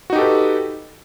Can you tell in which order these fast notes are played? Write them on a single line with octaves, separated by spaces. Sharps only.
F#4 D#4 G4 A4 B4